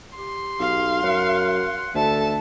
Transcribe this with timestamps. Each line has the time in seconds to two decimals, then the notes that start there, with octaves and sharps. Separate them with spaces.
0.17 G4 C6
0.60 B1 F5
1.03 F#2 F#5
1.95 D2 A4 E5 A5